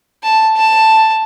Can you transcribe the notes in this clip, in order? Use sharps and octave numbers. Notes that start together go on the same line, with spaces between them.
A5
A5